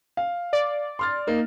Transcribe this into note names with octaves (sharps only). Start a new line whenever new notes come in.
F5
D5
C6 F6 A6
A#3 D#4